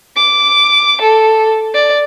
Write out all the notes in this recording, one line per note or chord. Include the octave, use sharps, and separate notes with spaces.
D6
A4
D5